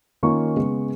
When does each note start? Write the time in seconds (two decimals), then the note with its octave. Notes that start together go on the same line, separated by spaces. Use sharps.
0.23 D#3 A#3 C#4 F4 C#6
0.56 C#3 G#3 B3